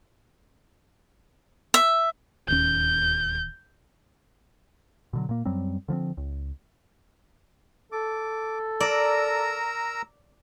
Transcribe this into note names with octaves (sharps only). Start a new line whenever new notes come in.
E5
D1 D#2 C#4 G6
B2 D3 F#3
A#2 A#3
F#2 F#3 G3 C4
D3 F3 A3 C4
C#2
A4 D6
A#4 D5 A#5 E6